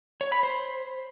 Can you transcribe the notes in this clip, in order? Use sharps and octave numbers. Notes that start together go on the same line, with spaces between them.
C#5
B5
C5